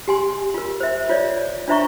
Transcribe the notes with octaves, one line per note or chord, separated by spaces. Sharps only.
G4 G#5 C6
F4 A#4
C5 E5
F4 C#5 D5
D4 F4 C5 E5 A#5 C#6